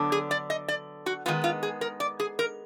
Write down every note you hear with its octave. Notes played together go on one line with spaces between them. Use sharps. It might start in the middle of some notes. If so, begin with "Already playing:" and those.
Already playing: D3 F#3 B3 D4
G#4
D5
D#5
D5
F#4
D#3 G#3 B3 F4
F4
G#4
A#4
D5
G#4
A#4